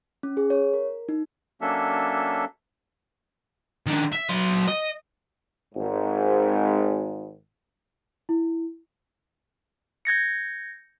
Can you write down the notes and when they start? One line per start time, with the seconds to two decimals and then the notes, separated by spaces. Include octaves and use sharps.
0.23 C#4
0.37 G#4
0.50 C#5
0.74 A#4
1.09 D#4
1.61 F#3 A#3 C#4 D4 A4 E5
3.86 D#3 D4
4.12 E5
4.29 F#3 C6
4.68 D#5
5.75 G#1 G#2
8.29 E4
10.05 G6 G#6 A#6 C#7